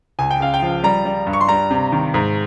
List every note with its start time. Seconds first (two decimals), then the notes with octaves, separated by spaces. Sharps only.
0.19 C#2 G#5
0.31 G5
0.40 C#3 F5
0.54 G5
0.62 F3
0.84 G3 A#5
1.05 G3
1.27 G2
1.33 C#6
1.41 C6
1.49 G3 A#5
1.70 C3
1.92 D#3
2.14 G#2